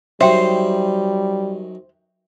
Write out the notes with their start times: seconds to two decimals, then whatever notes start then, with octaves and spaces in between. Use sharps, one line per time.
0.21 F#2 D#3 G3 C5 E5 G5